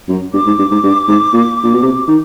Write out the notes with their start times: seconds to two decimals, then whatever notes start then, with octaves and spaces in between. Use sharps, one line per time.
0.09 F#2
0.33 G2 D6
0.46 G#2
0.59 G2
0.71 G#2
0.84 G2
1.08 G#2
1.34 A#2
1.64 A#2
1.74 B2
1.83 C3
2.08 D#3